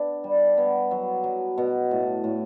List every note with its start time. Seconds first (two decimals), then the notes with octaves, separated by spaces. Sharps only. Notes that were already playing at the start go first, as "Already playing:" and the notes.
Already playing: B3 D4
0.24 G3
0.58 B3
0.91 F#3
1.24 F#3
1.58 B2
1.91 A2
2.24 A2